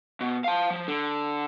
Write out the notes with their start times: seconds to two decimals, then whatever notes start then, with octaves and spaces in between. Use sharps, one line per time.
0.21 B2
0.44 F5 A5
0.70 F3
0.88 D3